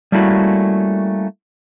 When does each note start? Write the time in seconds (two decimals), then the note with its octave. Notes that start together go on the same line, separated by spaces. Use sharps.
0.12 G3 A3 A#3 C#4 E4 F#4